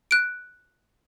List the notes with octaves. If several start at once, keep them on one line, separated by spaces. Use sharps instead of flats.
F#6 D7